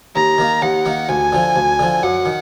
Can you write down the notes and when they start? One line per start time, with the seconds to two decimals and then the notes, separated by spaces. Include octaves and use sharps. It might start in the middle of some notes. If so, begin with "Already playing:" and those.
0.15 D#2 A#5
0.38 D#3 A#3
0.62 D#2 F#5
0.86 D#3 A#3
1.09 D2 G#5
1.32 D3 F3
1.56 D2
1.79 D3 F3
2.03 F#2 F#5
2.26 D#3